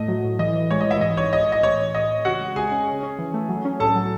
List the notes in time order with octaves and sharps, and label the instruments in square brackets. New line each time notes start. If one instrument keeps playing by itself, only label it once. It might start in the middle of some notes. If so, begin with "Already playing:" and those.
Already playing: [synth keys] A2 A3 [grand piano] D#5
[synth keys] F#3
A2
[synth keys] E3 [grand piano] D#5
[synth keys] A2
[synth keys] G#3 [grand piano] C#5
[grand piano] D#5
[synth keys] E3
[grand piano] E4 E5
[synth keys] G#2 [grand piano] D#5
[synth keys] G#1 [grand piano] C#5
[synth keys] G#2 [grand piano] D#5
[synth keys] E3 [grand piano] D#5
[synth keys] A2 [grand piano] C#5
[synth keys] A2
[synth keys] A2 [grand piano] D#5
[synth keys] A2
[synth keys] C#3 [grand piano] F#4 F#5
[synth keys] G#3
[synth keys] C#3 [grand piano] G#4 G#5
[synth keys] C#4
C#4
C#4
E3
A3
F#3
C#4
[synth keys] A2 [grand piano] A4 A5
[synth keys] F#3